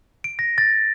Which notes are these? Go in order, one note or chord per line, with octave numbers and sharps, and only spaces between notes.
D7
A#6
A6